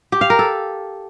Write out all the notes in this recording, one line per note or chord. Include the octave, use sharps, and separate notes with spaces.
G4
F5
A#4
A4